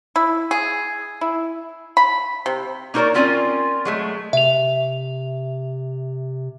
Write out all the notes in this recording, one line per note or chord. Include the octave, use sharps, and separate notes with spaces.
E4
G#4
E4
B5
C3
A#3 D#4 F#4 A#4 C#5 D5
C4 C#4 F4 A#4 D5 G#5
F#3 G#3 A3
C3 E5 F7